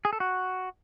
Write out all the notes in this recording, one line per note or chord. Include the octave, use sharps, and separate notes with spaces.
G#4
A4
F#4